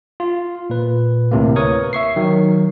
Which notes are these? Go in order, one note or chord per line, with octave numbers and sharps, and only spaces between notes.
F4
A#2 B4
D2 A2 C3 A#3
A#4 B4 C#5 C#6 D#6
E5 C#6 C7
D#3 F#3